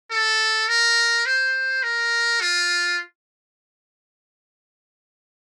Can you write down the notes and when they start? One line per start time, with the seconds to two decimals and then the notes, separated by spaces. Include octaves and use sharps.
0.11 A4
0.68 A#4
1.26 C5
1.83 A#4
2.41 F4